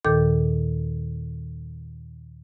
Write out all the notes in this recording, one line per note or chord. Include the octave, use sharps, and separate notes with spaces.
D#2 A#2 D#3 A4 D6 G6